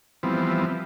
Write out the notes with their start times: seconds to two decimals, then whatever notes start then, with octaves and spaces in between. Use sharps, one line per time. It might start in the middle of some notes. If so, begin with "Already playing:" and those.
0.23 E3 F3 G3 B3 C4